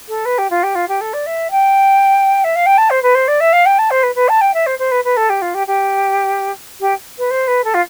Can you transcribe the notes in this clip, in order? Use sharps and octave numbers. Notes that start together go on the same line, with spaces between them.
A4
B4
G4
F4
G4
F4
G4
A4
D5
E5
G5
E5
F5
G5
A5
C5
B4
C5
D5
E5
F5
G5
A5
C5
B4
B4
A5
G5
E5
C5
C5
B4
B4
A4
G4
F4
G4
G4
G4
B4
C5
B4
A4
F4